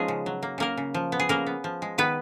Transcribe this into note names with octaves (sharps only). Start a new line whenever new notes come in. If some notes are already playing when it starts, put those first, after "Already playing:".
Already playing: F3 G#3 B3 C#4 D#4 F4 G#4
C#3
F#3
A#3
C#3 A#3 A#4
C#3
F3
B3
G#4
C#3 A#3 A#4
B3
F3
G#3
D#3 B3 B4